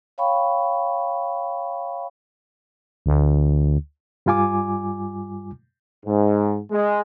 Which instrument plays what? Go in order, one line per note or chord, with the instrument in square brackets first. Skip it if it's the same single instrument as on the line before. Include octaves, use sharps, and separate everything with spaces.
[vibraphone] C#5 F5 G5 B5 C#6
[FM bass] D2
[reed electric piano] G2 G3 F4 G#5 D6
[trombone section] G#2
G#3